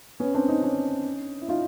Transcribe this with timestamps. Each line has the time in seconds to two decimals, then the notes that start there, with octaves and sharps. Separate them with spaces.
0.20 B3 C#4
0.35 C4 D4
0.48 C#4 D#4
0.63 C#4 D#4
1.41 E4
1.48 D#4 F4